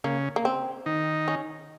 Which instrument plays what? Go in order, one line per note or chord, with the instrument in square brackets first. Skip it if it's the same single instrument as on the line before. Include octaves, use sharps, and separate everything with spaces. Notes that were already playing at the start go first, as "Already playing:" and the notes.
[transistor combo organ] C#3 C#4 [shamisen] A#3
[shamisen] A#3
C4
[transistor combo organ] D#3 D#4
[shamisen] C#4